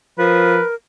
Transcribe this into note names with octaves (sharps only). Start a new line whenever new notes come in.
F3 A#4 B4